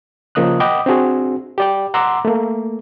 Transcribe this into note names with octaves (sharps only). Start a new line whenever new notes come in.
C#3 F3 A#3 D#5 D#6 F#6
D#5 F#5 G5 B5 D6 D#6
C4 D4 F#4 G#4
G4 D5 G5
F#5 A#5 C6 D6 E6
A3 A#3